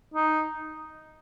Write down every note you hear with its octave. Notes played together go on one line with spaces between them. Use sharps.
D#4